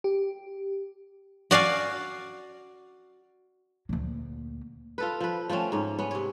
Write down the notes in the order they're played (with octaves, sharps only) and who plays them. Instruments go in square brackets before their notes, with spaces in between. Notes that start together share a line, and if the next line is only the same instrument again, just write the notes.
[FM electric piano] G4
[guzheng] F#4 D5 F5 G#5
[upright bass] D2 A#2
[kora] F4 A4 B4
F3 B4
F3 A3 C4 C#4
G#2 C#4
B3 C#4
C3 C#5